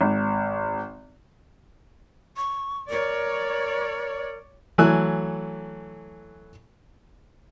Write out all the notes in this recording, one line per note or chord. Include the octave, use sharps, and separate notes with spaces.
G#1
C#6
A#4 C#5 D5
E3 F#3 A3 G#5 E6 F#6